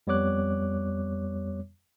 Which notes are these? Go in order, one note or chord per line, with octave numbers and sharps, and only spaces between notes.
F2 G3 B3 C#5 D6 F#6